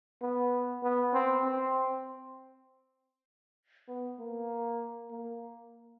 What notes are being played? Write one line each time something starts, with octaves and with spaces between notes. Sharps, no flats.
B3
B3
C4
C4
B3
A#3
A#3